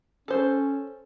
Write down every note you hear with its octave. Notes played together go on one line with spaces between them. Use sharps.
C#4 A4 C5